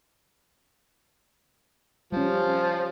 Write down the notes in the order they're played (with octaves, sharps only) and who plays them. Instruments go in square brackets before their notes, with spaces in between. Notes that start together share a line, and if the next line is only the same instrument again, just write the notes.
[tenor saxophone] F3 [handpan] G3 C#4